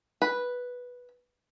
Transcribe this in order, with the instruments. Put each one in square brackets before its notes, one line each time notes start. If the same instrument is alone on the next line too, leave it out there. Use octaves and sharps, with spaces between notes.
[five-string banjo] B4